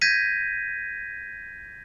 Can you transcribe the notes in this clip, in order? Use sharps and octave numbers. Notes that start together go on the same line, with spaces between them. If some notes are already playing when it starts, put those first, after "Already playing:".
G6 G#6 A#6 B6 D#7